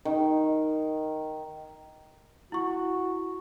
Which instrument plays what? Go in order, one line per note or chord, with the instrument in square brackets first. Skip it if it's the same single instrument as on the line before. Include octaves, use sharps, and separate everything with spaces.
[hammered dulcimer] D#3
[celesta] E4 C#6 [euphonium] F#4